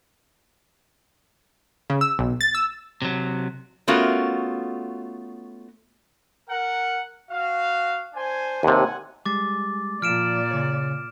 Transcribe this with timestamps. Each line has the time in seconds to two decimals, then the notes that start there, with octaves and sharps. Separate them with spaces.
1.90 C#3
2.01 E6
2.19 B1
2.41 A6
2.55 E6
3.02 C3 F#3
3.88 A3 B3 C#4 F4 F#4 A#4
6.50 A#4 F#5
7.30 F#4 F5
8.15 D4 C5 G#5
8.63 D#2 C3 F#5 G#5
9.26 G3 G#3 D6 A6
10.02 A#2 F3 D5 F6 D7 E7
10.51 C#3 C#5